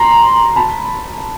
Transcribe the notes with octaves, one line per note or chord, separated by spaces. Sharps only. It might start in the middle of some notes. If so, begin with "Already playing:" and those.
Already playing: A#5 C6
A5 B5